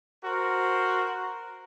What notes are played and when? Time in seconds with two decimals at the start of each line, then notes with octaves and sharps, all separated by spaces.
0.24 F#4 A#4 C5